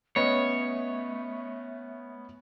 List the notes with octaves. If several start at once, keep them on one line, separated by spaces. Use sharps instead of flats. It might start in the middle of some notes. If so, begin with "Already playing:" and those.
A3 B3 C#4 C#5 D#5